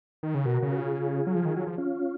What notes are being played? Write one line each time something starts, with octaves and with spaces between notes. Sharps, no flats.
D#3
C#3
B2 F#4 A#4
C#3
F#4
F4 G#4
F#3
F3
D#3
F#3
F3
C#4 F4